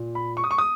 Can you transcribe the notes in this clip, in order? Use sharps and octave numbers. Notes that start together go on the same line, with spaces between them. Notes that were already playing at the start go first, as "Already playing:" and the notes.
Already playing: A#2
B5
C#6
D#6
C#6
D#6